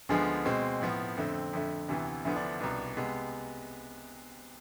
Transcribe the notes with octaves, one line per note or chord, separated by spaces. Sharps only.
D2 D3 F3 G#3 B3 G#4
B2 G#3 C4
A2 F3 B3
F2 D3 A3 C4
F2 D3 A3
D2 C3 E3 B3
D2 D3 F3 B3 E4
D4
C2 B2 B3 D4
C3 G#3 B3